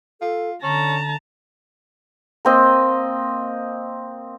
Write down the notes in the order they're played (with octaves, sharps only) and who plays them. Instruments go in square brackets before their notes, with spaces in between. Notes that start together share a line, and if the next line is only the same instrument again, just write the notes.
[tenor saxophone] F4 [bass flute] A4
[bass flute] D3 [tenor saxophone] C#4 [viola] A5 A#5
[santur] A#3 C4 D#5